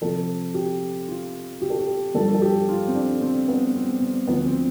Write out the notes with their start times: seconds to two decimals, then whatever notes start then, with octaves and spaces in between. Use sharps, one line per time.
0.01 F2 C3 F3 A4
0.54 G4
1.08 F4
1.62 G4
1.70 A4
1.79 G4
2.14 G2 F3 A4
2.35 A4
2.42 G4
2.69 F4
2.87 C4
2.94 D4
3.21 C4
3.48 B3
3.75 C4
4.01 C4
4.27 D2 D3 F3 B3
4.46 C4